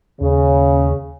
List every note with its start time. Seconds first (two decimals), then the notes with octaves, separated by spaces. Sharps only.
0.21 D#2 C#3